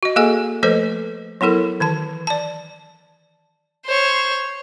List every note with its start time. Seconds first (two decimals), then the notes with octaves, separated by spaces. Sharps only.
0.03 F#4 D#5
0.16 A#3 G#4 A4 D#5 G#5
0.63 F3 A3 A4 B4 C5 D#5
1.41 F#3 B3 E4 A4 A#4
1.80 D#3 E3 A5
2.27 D5 A5
3.86 C5 C#5